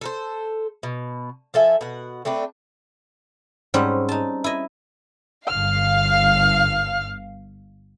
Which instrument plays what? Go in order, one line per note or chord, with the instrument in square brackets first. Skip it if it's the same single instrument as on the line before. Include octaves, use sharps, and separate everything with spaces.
[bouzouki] A4 A#4 C5
B2
F3 A4 E5 G#5
B2 F#5
A3 C4 D4 B4
[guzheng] G#2 G3 C4 C#4 F#5
D#4 A5
E4 D#5
[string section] G1 F5 [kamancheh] F6